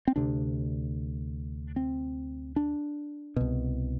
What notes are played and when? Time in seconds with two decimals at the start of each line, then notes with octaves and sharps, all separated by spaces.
0.08 C4
0.16 D2 C3 D4
1.76 C4
2.56 D4
3.36 C2 B2